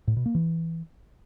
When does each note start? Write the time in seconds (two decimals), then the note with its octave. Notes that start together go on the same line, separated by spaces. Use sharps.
0.07 A2
0.16 B2
0.26 A#3
0.35 E3